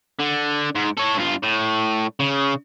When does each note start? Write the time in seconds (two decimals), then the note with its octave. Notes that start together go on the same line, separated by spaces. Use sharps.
0.20 D3
0.75 G#2
0.97 A4 C#5
1.17 G2 F4
1.43 A2
2.20 C#3